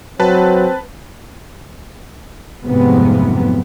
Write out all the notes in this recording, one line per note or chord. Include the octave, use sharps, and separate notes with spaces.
F#3 C4 B4 A5
F1 G#2 C3 F3 F#3 B3